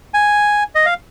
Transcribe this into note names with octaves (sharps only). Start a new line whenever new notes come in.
G#5
D#5
F5